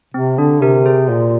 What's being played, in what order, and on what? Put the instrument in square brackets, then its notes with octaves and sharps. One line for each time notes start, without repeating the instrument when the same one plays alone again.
[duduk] C3 [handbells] C4
[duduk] D3 [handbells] D4
[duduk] C3 [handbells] G4 A#4
[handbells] G#4 C5
[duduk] A#2 [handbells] F4